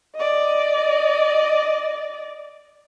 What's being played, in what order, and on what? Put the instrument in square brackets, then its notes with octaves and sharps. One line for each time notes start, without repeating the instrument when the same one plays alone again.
[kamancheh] D5 D#5